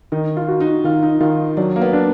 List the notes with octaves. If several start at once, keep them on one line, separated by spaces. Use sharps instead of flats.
D#3 D#4
F4
F#4
D#4
D#3 F4
D#4
D#3 F4
F#3 D4
A#3
B3
D4